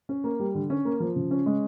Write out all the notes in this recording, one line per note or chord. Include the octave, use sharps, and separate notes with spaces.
C#4
A#3
G3
D3
C#4
A#3
F3
C#3
C#4
G#3